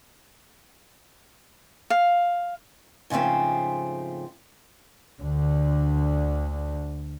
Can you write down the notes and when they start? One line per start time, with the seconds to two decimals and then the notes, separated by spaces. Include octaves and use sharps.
1.90 F5
3.10 G#2 C#3 F3 A3 C4
5.22 D2 D3